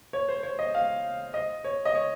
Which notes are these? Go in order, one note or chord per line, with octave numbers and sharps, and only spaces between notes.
C#5
C5
C#5
D#5
F5
D#5
C#5
D#5
C#5